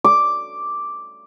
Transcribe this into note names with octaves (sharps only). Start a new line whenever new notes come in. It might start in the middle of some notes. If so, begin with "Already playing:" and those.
D6